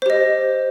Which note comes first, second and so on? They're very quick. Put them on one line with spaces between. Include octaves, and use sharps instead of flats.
C5 G4 D#5